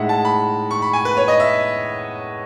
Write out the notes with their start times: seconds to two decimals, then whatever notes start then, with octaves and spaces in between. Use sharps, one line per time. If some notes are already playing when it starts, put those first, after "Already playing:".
Already playing: A2 G#3 D#4 E5 F#5
0.09 A5
0.25 B5
0.71 C#6
0.82 B5
0.93 G#5
1.05 B4
1.17 C#5
1.28 D#5
1.40 E5